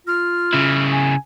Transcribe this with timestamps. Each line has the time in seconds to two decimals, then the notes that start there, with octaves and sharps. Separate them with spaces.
0.07 F4 F6
0.53 C#3 E4
0.92 G#5